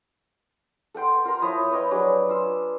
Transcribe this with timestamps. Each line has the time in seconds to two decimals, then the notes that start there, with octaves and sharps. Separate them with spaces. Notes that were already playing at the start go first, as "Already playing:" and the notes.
0.94 A4 F#5 G5 C6
1.25 F4 A#4 A#5
1.42 F3 E4 C#5 D#6
1.71 B4 C#5 D#5 G5
1.91 F#3 D4 G#4 D6
2.29 F4 E6